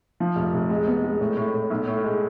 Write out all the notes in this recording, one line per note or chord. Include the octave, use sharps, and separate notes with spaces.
F3
F1
F1
G#3
B3
G#3
A2
A2
A2
B1
A2
G#3